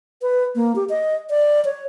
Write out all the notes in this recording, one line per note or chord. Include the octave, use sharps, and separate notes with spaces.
B4
A#3
G4
D#5
D5
C#5